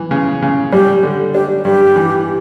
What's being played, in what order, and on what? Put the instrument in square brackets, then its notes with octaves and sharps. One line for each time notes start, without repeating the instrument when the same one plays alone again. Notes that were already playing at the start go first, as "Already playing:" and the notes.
Already playing: [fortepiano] E3
C#3
C#3
[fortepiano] G3 [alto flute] G4
[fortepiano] D3
[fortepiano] D4 [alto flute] G4
[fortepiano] G2 [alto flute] G4
[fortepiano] E3